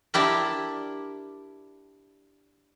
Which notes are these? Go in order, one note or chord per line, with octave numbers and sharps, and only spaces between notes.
D4 E4 G4 A#4